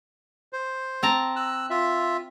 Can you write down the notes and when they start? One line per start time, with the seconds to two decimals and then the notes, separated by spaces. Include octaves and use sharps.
0.53 C5
1.03 C4 A5 A#5
1.36 E6 F#6
1.70 F4 E5